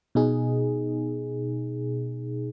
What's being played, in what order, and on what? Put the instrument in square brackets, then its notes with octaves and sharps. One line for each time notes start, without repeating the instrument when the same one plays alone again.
[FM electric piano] B2 D#4 G#4